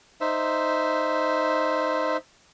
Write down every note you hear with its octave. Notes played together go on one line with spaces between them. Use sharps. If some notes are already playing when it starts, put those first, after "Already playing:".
D#4 C5 E5